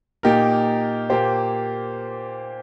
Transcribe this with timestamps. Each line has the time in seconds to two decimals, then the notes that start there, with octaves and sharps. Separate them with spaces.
0.23 A#2 A#3 D#4 G4 A#4
1.10 A#2 A#3 G4 C5